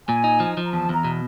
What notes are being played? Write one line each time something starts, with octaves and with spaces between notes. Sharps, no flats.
A#2 G#5
D#4
F3
F3
A#5
E2 A5
E2 A#5
B2